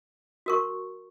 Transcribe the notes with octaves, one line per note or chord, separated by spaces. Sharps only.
F#4 A#4 C#6